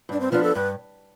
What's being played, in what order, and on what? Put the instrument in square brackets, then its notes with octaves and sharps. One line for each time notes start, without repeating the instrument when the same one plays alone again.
[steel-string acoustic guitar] G2 [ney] D4
[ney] C4
[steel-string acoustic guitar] F3 B3 D4 [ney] F4
[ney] A4
[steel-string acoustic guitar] G2 [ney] B4